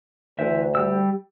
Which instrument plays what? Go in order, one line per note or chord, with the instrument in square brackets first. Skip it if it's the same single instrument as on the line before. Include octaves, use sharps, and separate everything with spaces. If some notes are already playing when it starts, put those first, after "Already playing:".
[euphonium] D2 [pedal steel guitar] E3 C5 E5
[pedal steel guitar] G3 G4 E6